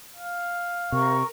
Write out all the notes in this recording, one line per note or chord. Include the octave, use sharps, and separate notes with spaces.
F5
C3 A#4 C#6